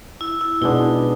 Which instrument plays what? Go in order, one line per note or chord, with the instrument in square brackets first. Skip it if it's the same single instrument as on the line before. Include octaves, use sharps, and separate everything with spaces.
[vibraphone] E4
E4
[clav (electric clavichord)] B2 G#3 B3 D4 [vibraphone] D#4